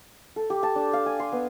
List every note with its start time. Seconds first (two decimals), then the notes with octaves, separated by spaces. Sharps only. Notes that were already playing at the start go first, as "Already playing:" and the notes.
0.36 A4
0.50 G4
0.63 A5
0.76 D4
0.93 F5
1.06 G#5
1.19 C6
1.32 B3